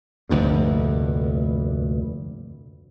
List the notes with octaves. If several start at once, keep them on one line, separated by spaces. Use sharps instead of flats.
F1 D2 G2 A#2